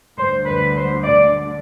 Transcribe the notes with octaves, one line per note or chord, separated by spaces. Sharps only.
D2 D3 G3 C5
B4
C5
D5